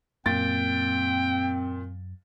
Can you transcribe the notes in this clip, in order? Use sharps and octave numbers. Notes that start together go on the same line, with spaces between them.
F#2 A#2 C4 G5 A6